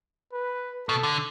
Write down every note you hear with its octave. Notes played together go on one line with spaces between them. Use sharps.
B4
B2 A4
D3